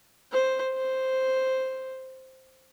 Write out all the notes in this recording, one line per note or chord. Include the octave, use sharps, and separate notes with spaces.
C5
C5